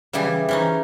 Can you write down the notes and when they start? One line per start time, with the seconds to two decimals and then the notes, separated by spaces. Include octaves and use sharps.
0.13 C#3 E3 G3 E4 G#4
0.49 E3 C#4 D#4